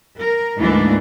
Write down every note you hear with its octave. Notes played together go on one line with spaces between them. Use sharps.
A#4
D2 G#2 E3 A#3 D4